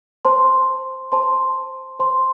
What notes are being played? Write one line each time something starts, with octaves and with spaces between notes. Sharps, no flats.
C5 A5 C6
C5 A5 C6
C5 A5 C6